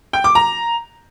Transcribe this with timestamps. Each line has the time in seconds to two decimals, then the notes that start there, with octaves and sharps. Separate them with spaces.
0.13 G5
0.24 D6
0.35 A#5